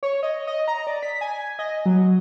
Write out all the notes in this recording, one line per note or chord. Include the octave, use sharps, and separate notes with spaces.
C#5
D#5
D#5
A#5
D5
B6
G#5
D#5
F#3